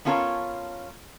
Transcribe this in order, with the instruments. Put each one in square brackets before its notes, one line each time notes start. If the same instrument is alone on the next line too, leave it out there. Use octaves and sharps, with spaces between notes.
[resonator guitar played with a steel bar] B3 C#4 F4 A4 A#4 C#5